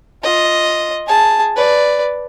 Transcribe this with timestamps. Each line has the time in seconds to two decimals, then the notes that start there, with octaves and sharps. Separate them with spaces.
0.23 F4 D#5
1.07 G#4 A5
1.56 B4 D5